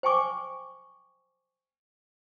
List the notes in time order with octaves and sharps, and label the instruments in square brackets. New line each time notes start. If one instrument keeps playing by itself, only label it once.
[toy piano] C5 G5 G#5 C#6 D6